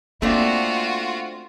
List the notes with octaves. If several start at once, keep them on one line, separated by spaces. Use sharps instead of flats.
A3 A#3 C4 D4 F4 F#4